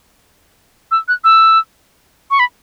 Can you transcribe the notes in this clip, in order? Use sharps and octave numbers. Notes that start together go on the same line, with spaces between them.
E6
F#6
E6
C#6
B5